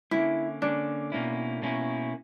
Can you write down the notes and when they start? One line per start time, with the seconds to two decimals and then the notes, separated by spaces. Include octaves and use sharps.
0.11 D3 A#3 C#4 E4
0.62 D3 A#3 C#4 D4
1.12 B2 A#3 C#4 E4
1.62 B2 A#3 C#4 E4